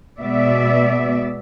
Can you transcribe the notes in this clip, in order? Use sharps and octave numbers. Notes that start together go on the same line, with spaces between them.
B2 G#3 B3 D5 E5